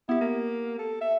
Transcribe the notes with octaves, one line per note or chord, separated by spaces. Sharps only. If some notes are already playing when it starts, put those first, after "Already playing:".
B3 E4 G4
A#3
A4
E5